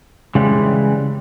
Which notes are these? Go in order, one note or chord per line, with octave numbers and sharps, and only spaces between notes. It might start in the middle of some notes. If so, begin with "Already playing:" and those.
C#3 E3 G3 G#3